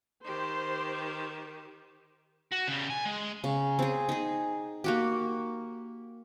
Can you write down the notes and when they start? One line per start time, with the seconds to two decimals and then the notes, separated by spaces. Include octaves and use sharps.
0.24 D#3 G4 C5
2.52 F#4
2.68 C#3 G3
2.91 G#5
3.06 G#3
3.44 C#3
3.79 C4 G#4
4.09 D#4 G#4
4.84 A#3 F#4 G4